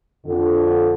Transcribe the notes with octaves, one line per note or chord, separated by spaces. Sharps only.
F2 D3